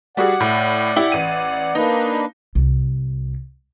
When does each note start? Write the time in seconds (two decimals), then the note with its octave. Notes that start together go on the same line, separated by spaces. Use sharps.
0.17 G3 F#4 G#4 D5 F#5
0.40 A2
0.96 E4 G4
1.12 A1 D#7
1.75 A#3 D4 D#4 B4
2.55 C2